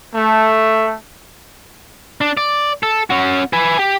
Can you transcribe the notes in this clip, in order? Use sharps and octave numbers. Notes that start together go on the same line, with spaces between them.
A3
D4
D5
A4
C#4 F#4
B4 G#5
G4